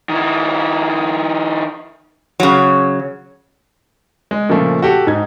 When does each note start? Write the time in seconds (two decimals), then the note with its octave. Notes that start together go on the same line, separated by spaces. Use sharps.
0.09 D#3 E4
2.40 C#3 F#3
4.31 G#3
4.49 A#2 C#3 F3 A3
4.82 F#4 G4 A4
5.07 G#2 D#4 G#6